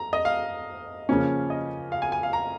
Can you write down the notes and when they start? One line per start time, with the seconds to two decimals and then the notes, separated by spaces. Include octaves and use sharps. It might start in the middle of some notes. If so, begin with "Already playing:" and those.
Already playing: A#5
0.13 D#5
0.25 F5
1.09 C#3 F3 A#3 C#4
1.50 D#5
1.92 F5
2.02 G#5
2.12 G#5
2.23 F5
2.33 A#5